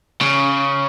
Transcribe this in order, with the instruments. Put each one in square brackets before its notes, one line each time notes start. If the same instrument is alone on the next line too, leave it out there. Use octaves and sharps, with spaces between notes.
[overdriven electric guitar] C#3